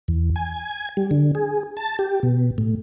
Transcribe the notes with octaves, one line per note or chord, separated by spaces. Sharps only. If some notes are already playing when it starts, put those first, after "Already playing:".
E2
G#5
G3
D3
G#4
A5
G4
B2
A2